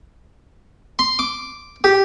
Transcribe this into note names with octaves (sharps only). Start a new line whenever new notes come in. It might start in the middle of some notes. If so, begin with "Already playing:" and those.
C6
D6
G4